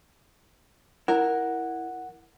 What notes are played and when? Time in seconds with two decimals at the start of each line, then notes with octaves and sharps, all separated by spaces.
1.08 E4 A#4 F#5